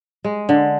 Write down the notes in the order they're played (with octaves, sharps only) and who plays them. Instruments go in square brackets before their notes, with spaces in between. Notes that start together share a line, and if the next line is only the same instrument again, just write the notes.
[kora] G#3
D3